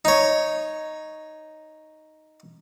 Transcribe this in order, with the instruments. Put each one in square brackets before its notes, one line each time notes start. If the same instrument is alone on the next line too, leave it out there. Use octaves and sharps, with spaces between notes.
[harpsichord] D#4 C#5